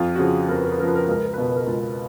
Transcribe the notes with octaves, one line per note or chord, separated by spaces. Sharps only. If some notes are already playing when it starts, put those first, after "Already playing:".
Already playing: F2 F4
F#4
C#3 F3 G#4
F2 A#4
B4
A#4
B4
C#3 F3 A#4 B4
A#4
B4
C#2 A#4
B4
A#4
B4
B2 A#4
B4
A#4
C#2 F4